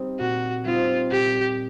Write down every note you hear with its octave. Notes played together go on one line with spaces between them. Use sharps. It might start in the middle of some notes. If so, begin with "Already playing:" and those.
Already playing: G3 C4 D#4
A#2 F#4
G3 C4 D#4 F4
A#2 G4